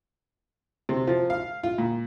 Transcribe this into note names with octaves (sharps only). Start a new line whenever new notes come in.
C3
F3
F5
F4
A#2